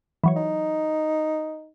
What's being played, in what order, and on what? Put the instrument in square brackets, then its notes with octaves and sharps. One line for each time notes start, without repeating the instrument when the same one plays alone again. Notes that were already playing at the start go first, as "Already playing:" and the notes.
[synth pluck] E3 F#3 C#5
[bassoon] D#4